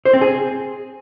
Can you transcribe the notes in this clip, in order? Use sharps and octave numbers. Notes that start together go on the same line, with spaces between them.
C5
C4
G#4